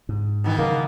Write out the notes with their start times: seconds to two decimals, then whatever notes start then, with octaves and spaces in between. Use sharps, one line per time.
0.09 G#2
0.44 B2 D#3 E3
0.58 C#3 F#3 A#3